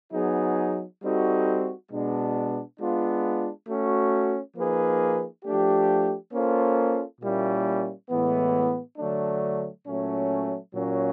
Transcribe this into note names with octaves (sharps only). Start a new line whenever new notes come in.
F#3 B3 D#4 G#4
G3 C4 D#4 F#4 A4
B2 G#3 B3 D4
G#3 B3 D4 F4
A3 C#4 F#4
F3 A#3 D#4 G#4 B4
F3 A3 D4 G4
A#3 C#4 F4 A4 C5
A#2 G3 A#3 C#4 E4
A2 E3 G#3 B3
D3 F#3 A3 D4
A#2 F#3 A3 C#4
A#2 F#3 A#3 C#4